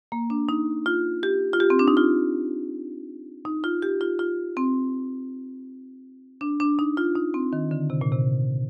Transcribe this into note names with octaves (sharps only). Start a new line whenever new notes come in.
A#3
D4
D#4
F4
G4
F4
G4
C4
D4
D#4
F4
D#4
F4
G4
F4
F4
C4
D4
D4
D#4
F4
D#4
C4
D#3
D3
C3
A#2
C3